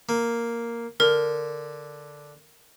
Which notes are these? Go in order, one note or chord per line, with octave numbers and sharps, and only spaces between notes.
A#3
D3 A#4